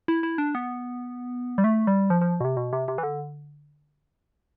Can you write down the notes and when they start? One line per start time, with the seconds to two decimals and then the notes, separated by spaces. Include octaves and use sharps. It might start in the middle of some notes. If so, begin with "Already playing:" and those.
0.08 E4
0.23 E4
0.38 D4
0.55 B3
1.58 G3
1.64 A3
1.87 G3
2.10 F3
2.21 F3
2.40 B2
2.45 C3
2.57 B2
2.73 C3
2.88 C3
2.98 E3
3.03 D3